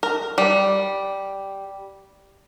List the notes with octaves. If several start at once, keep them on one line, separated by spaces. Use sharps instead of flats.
A#4
G3